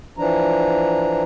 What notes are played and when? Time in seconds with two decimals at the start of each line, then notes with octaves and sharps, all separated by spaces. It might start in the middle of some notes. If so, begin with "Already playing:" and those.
0.18 E3 F3 D4 A#5